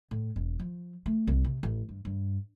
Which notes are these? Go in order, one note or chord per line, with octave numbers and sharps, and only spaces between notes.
A2
E1
F3
A3
C2
C3
A1
G2
G2